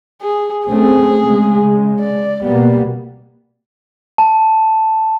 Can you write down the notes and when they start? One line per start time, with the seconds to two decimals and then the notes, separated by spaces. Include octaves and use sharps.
0.22 G#4
0.67 A3 C4 C#4 G#4
1.24 C#3 G#3
2.00 D5
2.43 B2 G3 A#3 B3
4.18 A5